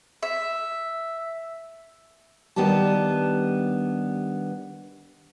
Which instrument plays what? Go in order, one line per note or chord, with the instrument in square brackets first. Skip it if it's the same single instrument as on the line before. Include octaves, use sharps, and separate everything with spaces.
[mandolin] E5
[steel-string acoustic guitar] D#3 G3 B3 D4 G4 A5